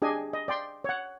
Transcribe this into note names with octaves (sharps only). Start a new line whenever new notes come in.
D4 G4 G#4 D#5 G#5
D#5
D5 G5 C6
C#5 F#5